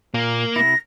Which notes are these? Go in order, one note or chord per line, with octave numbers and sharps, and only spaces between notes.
A#2 A#3
C3 E4 A#6